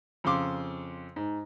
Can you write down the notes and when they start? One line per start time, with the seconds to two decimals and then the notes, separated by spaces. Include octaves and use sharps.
0.24 F2 C#3 F5 C6 D6
1.16 G#2